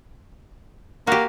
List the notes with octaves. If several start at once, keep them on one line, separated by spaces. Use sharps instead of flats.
A#3 F#4 G4